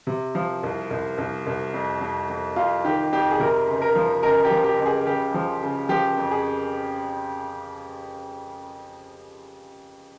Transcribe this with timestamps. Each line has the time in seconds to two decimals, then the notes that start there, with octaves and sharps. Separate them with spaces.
0.07 C3
0.35 F3
0.63 C2
0.91 C2
1.18 C2
1.47 C2
1.74 F2
2.01 F2
2.30 F2
2.56 F2 F4
2.85 D#3 G4
3.12 F2 G4
3.31 G#4
3.40 C3 A#4
3.67 C#2
3.82 A#4
3.95 F3
4.23 C#2 A#4
4.45 G4
4.51 F3
4.64 G4
4.79 C#2
4.86 G#4
5.07 C#3 G4
5.34 F3
5.62 C#3
5.89 F3 G4
6.18 F2
6.31 G#4